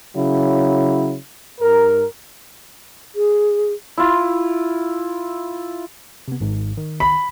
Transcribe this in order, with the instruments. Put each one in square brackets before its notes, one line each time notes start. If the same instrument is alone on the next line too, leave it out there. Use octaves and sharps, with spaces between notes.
[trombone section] C#3 F#3 E4
G2 A#4
[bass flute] G#4
[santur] E4 F4
[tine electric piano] C3 B3
G#1 G#2
D#3
[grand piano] B5